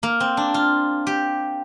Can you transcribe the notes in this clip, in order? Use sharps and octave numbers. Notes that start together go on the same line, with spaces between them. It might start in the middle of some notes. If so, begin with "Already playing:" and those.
A#3
C4
D4
F4
G4